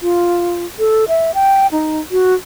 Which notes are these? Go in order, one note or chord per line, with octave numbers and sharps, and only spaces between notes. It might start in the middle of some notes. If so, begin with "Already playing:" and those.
F4
A4
E5
G5
D#4
F#4